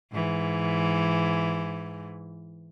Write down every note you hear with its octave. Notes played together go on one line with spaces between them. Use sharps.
G#2 E3